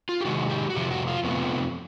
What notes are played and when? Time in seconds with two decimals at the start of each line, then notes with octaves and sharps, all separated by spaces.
0.09 F4
0.21 G4
0.25 C3 D#3 G#3 F#4
0.50 G4
0.70 F#4
0.75 F2 C3 F3 G4
0.91 F#4
1.08 F4
1.24 F2 C3 F3 A3 B3